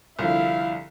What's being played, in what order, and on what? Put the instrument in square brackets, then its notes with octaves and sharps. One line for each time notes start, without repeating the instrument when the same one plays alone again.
[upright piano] C2 D3 F3 [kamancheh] E4 F5